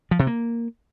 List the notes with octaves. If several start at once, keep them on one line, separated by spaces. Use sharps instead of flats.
F3
C3
A#3